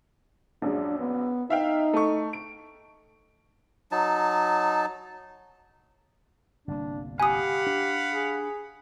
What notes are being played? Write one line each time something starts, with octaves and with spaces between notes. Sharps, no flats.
A#1 F#2 G#3 D4
B3
D#4 E5 F5 G5
A3 C#6
D7
F#3 D#4 A5
G1 C2 A#3 D4
G4 F5 F#5 G#5 B5 D#6
D4
G#4